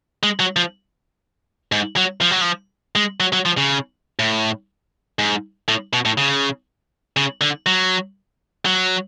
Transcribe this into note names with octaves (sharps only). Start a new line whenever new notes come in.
G#3
F#3
F3
G#2
F#3
F3
F#3
F3
G#3
F#3
F#3
F3
C#3
A2
G#2
A2
B2
A2
C#3
C#3
D3
F#3
F#3